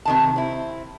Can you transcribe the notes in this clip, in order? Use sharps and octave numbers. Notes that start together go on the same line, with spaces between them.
C3 D#3 A5
C4 E4